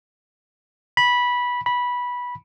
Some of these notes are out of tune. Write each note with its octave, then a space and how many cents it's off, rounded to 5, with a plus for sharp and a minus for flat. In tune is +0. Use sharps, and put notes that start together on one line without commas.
B5 -15
B5 -15